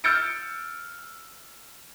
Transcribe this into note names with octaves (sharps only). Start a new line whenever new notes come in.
E6 F6 G6 A6 C#7 D7